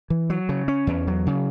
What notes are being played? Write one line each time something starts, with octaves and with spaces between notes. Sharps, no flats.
E3
F#3
C#3
C#4
E2
F#3
C#3